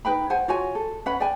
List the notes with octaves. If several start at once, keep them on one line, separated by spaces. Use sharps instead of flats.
D#4 B4 G5 B5
C5 F#5 G#5
F4 F#4 C#5 G#5
A4
C#4 B4 F#5 B5
D5 G5 G#5